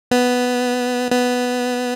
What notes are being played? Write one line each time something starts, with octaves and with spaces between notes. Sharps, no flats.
B3
B3